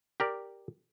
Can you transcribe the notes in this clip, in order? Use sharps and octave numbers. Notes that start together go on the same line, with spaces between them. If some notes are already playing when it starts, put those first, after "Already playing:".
G4 A#4 D5